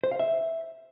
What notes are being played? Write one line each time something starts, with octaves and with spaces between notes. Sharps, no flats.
C5
F5
E5